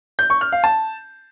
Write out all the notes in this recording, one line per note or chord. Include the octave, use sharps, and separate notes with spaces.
G6
C#6
F6
F5
A5